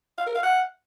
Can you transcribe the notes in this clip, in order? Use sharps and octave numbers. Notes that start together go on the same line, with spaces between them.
F5
A#4
F5
F#5